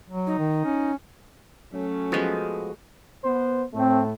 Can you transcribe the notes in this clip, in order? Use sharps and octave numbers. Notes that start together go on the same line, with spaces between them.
F#3
D#4
D#3
C#4
F#3 A3 C#4
F3 G#3 B3 F#4
B3 C5
A2 A3 C4